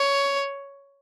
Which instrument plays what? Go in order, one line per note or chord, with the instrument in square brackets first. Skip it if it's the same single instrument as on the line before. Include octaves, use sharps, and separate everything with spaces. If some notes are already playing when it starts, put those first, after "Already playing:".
Already playing: [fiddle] C#5